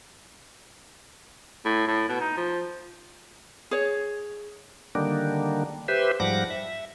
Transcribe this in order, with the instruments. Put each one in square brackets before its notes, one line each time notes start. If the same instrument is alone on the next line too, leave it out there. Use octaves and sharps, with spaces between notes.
[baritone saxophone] A2
A2
B2
D#4
F3
[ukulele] G#4 C#5
[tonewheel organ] D3 D#3 G3 A#3 D4
G4 B4 C5 E5
G#2 F3 G3 F#5 D6 A#6
E5